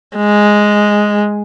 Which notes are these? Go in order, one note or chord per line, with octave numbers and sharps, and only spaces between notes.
G#3